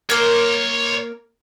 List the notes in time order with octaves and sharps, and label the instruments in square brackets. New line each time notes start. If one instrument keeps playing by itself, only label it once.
[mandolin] A#3 A#4 [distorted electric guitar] C#5 C6